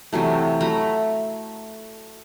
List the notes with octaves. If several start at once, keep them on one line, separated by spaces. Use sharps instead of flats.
C3 E3 F#3 A3
F#3 A3 A#5 B5